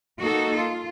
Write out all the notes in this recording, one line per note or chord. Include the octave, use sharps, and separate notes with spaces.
A#3 D#4 F#4 A4
F4